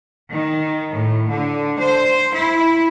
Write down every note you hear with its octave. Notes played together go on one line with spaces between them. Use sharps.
D#3
A2
D3
C5
E4